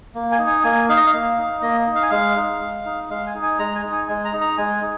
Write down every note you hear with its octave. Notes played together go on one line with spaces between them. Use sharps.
A#3
G#5
D#4
G#5
A#3 G#5
D#4 F5
D#5
F5
A#3
D#4
A#3 D#5
D#4
F5
G#5
G#3 F5
D#4
G#3
D#4
G#3 F5
G#5
D#4
G#5
G#3 A#5
G#5
D#4
G#5
G#3 G#5
A#5
D#4
A#5
G#3 G#5
D#4